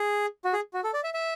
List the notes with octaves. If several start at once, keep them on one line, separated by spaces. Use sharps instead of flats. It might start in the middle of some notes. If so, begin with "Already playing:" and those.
Already playing: G#4
F#4
G#4
F#4
A4
D5
E5
E5